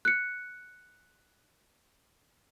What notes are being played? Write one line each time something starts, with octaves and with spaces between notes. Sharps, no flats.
F#6 C#7